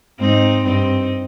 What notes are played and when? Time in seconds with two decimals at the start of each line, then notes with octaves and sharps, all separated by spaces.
0.19 G#2 C4 D#4
0.64 G2 C4 D#4